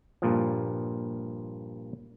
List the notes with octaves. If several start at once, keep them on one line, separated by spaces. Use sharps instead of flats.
G2 A#2 F3